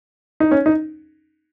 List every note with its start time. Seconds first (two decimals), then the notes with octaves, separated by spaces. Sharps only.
0.40 D#4
0.51 C#4
0.66 D#4